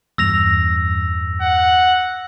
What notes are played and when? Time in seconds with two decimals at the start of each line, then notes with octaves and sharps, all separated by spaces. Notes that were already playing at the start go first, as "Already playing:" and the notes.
0.18 E2 G2 E6 A#6 F7
1.41 F#5